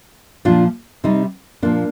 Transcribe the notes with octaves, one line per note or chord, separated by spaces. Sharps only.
A#2 F3 D4 F4
C3 G3 C4 D#4
A#2 F3 A#3 D4